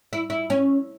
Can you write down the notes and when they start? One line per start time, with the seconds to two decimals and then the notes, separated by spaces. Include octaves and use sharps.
0.13 E4
0.30 E4
0.50 C#4